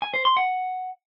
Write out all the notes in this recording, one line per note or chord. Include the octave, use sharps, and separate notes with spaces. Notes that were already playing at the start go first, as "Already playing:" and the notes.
G#5
C5
C6
F#5